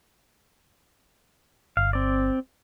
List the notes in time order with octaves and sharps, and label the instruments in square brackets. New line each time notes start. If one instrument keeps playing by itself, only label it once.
[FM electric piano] G1 [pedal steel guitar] F5
[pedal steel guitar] C4 D5